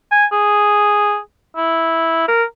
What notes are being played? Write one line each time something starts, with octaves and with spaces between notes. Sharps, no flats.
G#5
G#4
E4
A#4